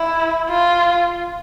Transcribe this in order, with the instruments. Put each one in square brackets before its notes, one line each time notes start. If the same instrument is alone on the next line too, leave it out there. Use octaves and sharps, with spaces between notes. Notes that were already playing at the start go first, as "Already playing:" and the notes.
Already playing: [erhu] E4
F4